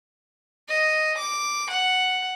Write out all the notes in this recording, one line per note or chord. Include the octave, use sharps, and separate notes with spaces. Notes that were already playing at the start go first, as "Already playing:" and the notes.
D#5
D6
F#5